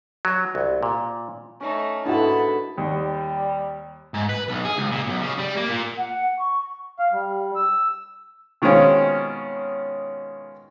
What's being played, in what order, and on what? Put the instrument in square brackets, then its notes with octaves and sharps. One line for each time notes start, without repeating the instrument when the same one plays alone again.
[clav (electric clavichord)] F#3
C2
A#2
[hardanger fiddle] A3 D#4 [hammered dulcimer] C#4
[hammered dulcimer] G#2 D3 A4 [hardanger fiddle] B3 [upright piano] E4 F#4 [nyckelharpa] A5 B5
[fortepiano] D#2 [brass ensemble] G3
[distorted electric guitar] G#2
B4
B1
G#4
C#2
A#2
B1
C#3
G3
A#3
A#2
[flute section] F#5
C#6
[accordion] F5
G3
E6
[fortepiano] B2 D#3 G#3 C4 C#4 F4